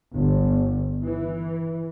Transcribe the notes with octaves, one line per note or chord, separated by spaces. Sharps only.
G1
E3